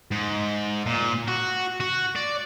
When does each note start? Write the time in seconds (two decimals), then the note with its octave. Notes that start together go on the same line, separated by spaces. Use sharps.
0.11 G#2
0.87 A#2
1.28 F#4
1.80 F#4
2.16 D5